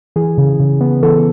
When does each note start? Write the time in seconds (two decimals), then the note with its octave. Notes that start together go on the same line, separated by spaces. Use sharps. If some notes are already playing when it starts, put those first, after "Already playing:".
0.16 E3 G#4
0.38 C#3
0.60 C#3
0.81 B3
1.03 E3 A4